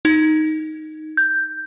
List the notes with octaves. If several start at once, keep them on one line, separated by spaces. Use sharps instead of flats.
D#4
G6